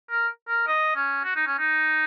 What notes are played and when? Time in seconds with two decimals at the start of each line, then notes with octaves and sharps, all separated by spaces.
0.11 A#4
0.48 A#4
0.68 D#5
0.96 C#4
1.24 F#4
1.36 D#4
1.47 C#4
1.58 D#4